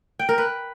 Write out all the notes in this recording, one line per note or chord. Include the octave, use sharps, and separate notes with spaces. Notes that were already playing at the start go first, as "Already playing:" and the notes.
G5
A#4
B4